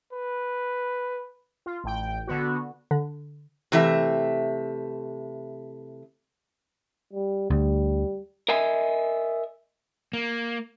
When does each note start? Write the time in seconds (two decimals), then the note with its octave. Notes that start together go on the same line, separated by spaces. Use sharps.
0.13 B4
1.66 F4
1.84 A1 G5
2.27 D3 B3 F#4
2.91 D3
3.72 C3 E3 A3 E5
7.13 G3
7.50 D2 G3
8.49 A#4 D#5 E5 G#5
10.13 A#3